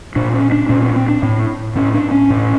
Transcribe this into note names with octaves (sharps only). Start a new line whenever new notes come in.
A#2 D4
C#4
D4
A#2 C#4
C4
C4
D4
A2
A2 C#4
D4
C#4
A2